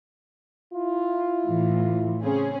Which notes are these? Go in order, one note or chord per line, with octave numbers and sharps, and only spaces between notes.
E4 F4
A2 E3
C#3 C4 C#4 G#4